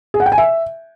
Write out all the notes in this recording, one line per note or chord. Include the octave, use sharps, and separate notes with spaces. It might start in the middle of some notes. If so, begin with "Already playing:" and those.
G#4
F#5
G5
G#5
E5